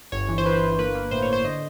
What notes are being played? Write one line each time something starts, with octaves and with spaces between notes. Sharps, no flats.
G1 C#5
E3
C5
E3 B4
G1
A#3 B4
A#3
A2 C5
C#5
A2 C5
D3 D#5